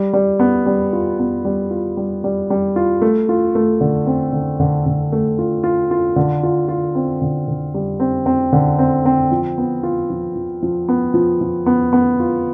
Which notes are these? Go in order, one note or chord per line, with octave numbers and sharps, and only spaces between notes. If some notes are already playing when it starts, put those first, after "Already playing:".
Already playing: G3
G3
B3
G3
F4
B3
G3
F4
G3
G3
G3
F4
A3
F4
A3
D3
C4
D3
D3
D3
A3
F4
F4
F4
D3
F4
F4
C4
D3
D3
G3
C4
C4
D3
C4
C4
F3
B3
F4
F3
F3
F3
B3
F3
F3
B3
B3
F4